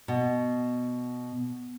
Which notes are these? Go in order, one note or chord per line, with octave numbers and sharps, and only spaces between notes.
B2